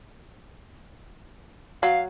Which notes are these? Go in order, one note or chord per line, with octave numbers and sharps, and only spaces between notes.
F#3 F5